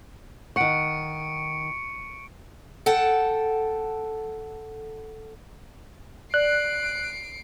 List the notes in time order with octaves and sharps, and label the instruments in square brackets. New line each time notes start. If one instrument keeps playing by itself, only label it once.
[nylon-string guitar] D#3 F#5 [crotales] C#6 C#7 D7
[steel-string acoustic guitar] A4 F#5 G5 A5
[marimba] D5 [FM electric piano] F#6 [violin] C7 D7